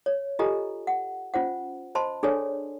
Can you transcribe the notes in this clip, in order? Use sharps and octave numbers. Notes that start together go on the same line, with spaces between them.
C#5
F4 G4 A4 D#5 G#5 A#5
F#5
C#4 F4 C5 F#5
C5 D#5 A5 B5 C6
D4 G#4 A4 C#5 D5 G#5